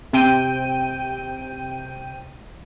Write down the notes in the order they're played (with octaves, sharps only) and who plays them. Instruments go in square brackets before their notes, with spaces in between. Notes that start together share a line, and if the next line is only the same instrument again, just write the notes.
[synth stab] C3 C4 G5 D#7